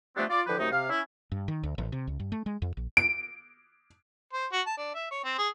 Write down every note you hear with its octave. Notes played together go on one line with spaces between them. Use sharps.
F3 G3 A3 B3 C4 D4
F4 D5
D3 E3 F3 G4 B4
F#2 C3 A3 D#4
C3 F5
C#4 E4
G2
D#3
D2
A1
C3
C#2
G2
A3
G#3
F2
A#1
D7
C5
F#4
A5
D4
E5
C#5
C4
G#4